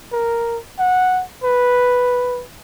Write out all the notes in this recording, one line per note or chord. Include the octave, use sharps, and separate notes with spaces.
A#4
F#5
B4